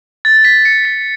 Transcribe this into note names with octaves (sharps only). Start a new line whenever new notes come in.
A6
B6
C#7
B6